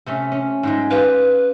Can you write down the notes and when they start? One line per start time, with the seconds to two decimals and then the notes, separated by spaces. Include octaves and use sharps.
0.06 C3 A3 C#4
0.32 C#4
0.63 G#2 F#3 G#3
0.91 F4 G4 B4